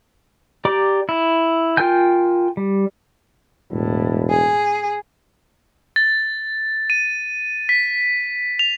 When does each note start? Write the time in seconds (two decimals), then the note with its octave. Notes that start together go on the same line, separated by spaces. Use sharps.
0.65 G4 D5 A#5 D6
1.09 E4
1.77 F4 A#4 G5 G#5 G6
2.57 G3
3.71 E1 A2
4.30 G#4
5.96 A6
6.90 D#7
7.69 B6
8.59 F7